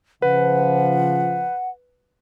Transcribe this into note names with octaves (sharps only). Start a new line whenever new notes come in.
C#3 F3 B4 F#5